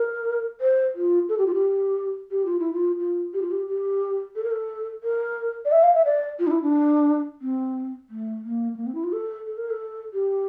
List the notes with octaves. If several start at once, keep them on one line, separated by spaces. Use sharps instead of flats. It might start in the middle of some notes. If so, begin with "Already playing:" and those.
Already playing: A#4
C5
F4
A4
G4
F4
G4
G4
F4
E4
F4
F4
G4
F4
G4
G4
A4
A#4
A4
A#4
D5
E5
F5
E5
D5
F4
D4
E4
D4
C4
A3
A#3
A3
A#3
C4
E4
F4
A4
A4
A#4
A4
G4